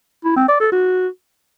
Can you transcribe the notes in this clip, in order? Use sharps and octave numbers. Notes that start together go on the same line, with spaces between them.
E4
C4
D5
A4
F#4